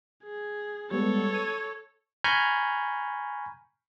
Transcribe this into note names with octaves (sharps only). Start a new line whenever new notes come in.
G#4
G3 G#3 B3 A4 C#5
D#7
G#5 A#5 B5 C#6 F6 G6